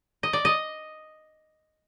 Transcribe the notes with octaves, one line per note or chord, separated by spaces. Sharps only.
D#5
D5
D#5